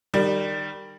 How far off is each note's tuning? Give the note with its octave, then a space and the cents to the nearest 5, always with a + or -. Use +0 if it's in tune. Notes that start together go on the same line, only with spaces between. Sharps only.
D#3 -25 G3 +0